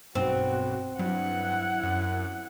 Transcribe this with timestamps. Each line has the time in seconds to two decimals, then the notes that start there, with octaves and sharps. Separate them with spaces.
0.15 B1 G2 C4 F#4
0.99 G2 F#3 E4 F#5
1.83 F#2